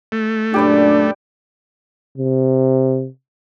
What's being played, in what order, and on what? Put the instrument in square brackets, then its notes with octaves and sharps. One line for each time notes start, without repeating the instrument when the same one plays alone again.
[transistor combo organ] A3
[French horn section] F#2 A#2 D4 [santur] G4 B4 D5
[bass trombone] C3